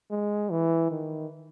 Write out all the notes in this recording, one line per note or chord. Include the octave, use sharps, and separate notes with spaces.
G#3
E3
D#3